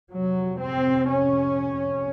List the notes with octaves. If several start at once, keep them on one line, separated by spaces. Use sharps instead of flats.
F2 C3 F#3
C4
C#4